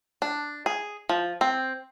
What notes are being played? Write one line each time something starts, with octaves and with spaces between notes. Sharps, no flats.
D4
G#4
F3
C4